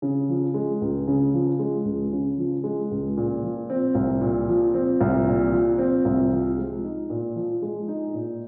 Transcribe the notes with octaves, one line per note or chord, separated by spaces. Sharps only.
C#3
F3
G#3
C#2
C#3
F3
G#3
C#2
C#3
F3
G#3
C#2
A#2
F3
C4
C2
A#2
F3
C4
C2
A#2
F3
C4
C2
F3
G#3
D#4
A#2
F3
G#3
D#4
A#2